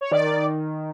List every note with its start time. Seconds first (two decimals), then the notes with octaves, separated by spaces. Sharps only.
0.01 C#5
0.11 D#3 D5